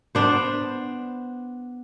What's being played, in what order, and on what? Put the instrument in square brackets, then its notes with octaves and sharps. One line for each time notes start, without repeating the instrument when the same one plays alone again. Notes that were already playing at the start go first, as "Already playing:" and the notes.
[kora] B3 D4 C5